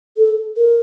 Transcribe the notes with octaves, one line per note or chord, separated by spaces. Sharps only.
A4
A#4